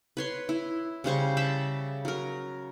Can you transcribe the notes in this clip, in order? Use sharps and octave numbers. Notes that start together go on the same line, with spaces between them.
B4 C#5 C6
E4
C#3 G3 C5 C#6
E5 G5 A5 B5
F#3 A#4